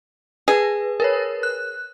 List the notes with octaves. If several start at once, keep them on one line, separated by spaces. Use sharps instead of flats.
G#4 B4
A#4 B4 C#5
F#6